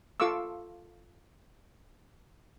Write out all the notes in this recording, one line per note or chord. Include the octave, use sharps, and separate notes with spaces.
F4 A4 F5 C#6 D6 E6